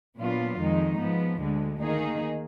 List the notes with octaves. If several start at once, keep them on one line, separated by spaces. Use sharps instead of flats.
A#2 F#3 B3 D4 F4
F2 D#3 G#3 D#4
G#2 F3 B3
D2 D3 G#3
D#3 A#3 D#4 G#4